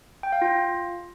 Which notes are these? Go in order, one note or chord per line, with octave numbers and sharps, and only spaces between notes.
G5
F5
F4